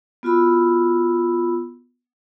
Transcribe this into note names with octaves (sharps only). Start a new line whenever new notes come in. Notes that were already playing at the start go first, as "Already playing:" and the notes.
B3 F4 F#4 B5 E6